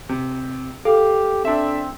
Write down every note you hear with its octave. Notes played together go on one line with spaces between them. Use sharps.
C3
G4 A4 F5
C4 D4 E5